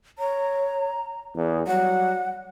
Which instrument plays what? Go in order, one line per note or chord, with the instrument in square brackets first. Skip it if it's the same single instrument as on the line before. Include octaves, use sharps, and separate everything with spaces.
[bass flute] C#5 [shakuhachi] A#5
[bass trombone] E2 [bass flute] G#4
[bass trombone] F#3 [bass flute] G3 [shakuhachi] F#5